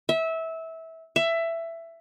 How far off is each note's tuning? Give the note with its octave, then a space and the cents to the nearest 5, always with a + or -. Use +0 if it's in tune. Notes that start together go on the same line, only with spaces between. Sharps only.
E5 -20
E5 +15